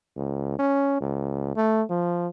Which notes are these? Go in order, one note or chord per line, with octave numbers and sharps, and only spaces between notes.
C#2
C#4
C#2
A3
F3